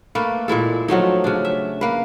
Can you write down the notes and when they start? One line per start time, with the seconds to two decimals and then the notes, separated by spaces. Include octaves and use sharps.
0.15 A3 A#3 A4 B4
0.48 A#2 G#3 E4 A4
0.88 F3 F#3 A3 D#4
1.24 C#3 D4
1.45 E5
1.81 A#3 B4